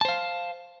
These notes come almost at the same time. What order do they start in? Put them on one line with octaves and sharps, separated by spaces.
A5 C5 F5